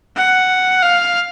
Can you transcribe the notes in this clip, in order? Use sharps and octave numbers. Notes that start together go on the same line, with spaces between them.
F#5
F5